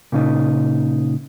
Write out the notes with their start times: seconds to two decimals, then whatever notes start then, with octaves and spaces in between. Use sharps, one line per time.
0.12 A#2 C#3 D#4